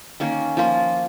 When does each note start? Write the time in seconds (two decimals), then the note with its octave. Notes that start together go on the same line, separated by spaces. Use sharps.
0.20 D#3 A#3 C#4
0.57 F3 A#3 F4